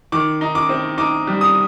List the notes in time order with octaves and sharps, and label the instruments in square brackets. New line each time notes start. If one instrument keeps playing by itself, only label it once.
[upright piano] D#3 D6
D#4
D6
C4
D#4 D6
G3
D#6